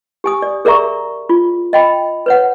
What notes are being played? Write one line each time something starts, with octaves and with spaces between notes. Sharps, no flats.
G4 G#5 D#6
D5
G#4 A#4 D5 E5 A#5 C#6
F4
D#5 G5 B5
B4 C#5 F#5